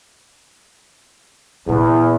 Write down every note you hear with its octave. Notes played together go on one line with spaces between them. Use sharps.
E2 A#2 A#3